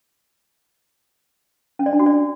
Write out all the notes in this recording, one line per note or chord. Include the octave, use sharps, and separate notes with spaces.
C#4
D5
D4
F#4
D5